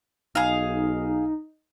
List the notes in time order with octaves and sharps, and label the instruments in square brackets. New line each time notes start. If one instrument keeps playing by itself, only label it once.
[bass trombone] B1 [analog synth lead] D#4 [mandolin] G#4 F5